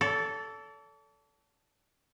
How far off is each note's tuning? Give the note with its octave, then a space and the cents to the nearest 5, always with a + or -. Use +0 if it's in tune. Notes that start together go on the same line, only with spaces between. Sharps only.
A4 +0 D5 -45